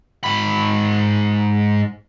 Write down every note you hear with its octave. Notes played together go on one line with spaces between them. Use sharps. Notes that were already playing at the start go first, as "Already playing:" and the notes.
G#2 B5